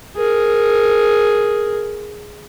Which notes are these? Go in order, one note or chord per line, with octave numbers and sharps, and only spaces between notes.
G#4 A#4